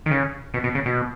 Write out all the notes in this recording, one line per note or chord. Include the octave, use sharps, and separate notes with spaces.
D#3
C#3
B2
B2
C#3
B2